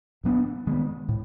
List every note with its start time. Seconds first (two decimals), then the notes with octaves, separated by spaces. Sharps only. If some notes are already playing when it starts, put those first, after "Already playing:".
0.24 A2 F#3 B3 D4
0.67 D#3 G#3 B3
1.08 A2